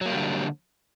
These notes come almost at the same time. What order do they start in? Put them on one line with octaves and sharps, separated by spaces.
F#3 A#3 G3 D3